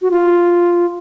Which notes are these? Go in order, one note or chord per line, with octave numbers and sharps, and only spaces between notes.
F#4
F4